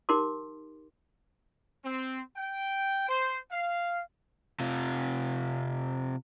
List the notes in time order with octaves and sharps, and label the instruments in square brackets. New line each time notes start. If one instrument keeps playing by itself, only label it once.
[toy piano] D#4 G4 A#4 C6 D6
[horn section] C4
G5
C5
F5
[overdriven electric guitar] C3 F4